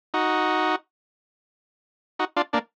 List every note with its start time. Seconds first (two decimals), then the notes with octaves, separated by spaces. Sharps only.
0.14 D#4 F#4
2.19 D#4 F#4
2.37 D4 F4
2.53 A#3 D4